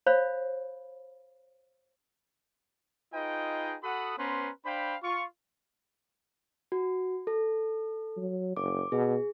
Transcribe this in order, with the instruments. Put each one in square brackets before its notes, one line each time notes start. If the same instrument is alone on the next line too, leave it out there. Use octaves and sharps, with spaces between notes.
[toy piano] C5 C#5 F5 B5
[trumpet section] D#4 F4 G#4 B4 D#5 G5
F#4 A4 F#5 B5 D#6
B3 C#4 B4 C5 A#5 C6
D4 C5 F5 G5 B5
F4 C#6
[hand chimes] F#4
A4
[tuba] F#3
[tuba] F#1 [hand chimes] D6
[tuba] B2 [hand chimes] G#4